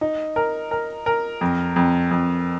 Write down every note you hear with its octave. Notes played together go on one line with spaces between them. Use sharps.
D#4
A#4
A#4
A#4
F2
F2
F2